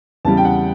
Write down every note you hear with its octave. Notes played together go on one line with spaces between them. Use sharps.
E2 C#3 G3 A5
G5
F#5